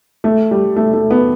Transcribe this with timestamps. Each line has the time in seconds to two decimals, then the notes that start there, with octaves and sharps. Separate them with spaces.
0.24 A3
0.51 G3
0.76 A3
0.93 A3
1.11 B3